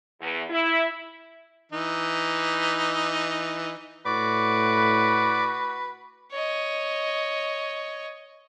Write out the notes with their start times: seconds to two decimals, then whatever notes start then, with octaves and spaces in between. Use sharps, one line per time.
0.21 E2
0.50 E4
1.72 E3 D#4
4.06 A2 F#4 B4 D5 D6
6.31 C#5 D#5